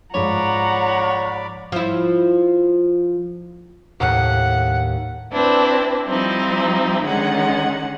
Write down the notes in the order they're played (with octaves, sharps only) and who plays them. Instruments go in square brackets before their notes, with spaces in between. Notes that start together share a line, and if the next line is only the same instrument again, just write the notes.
[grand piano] G#2 F3 [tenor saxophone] C#5 [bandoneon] D5 B5 D6 [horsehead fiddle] F#5 A#5
[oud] F3 E4
[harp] D#2 A2 [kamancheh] F#5
[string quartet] C4 D4 E4 B4
F3 G3 C4 D#4 E4
D3 D#3 G#3 C#4 F#5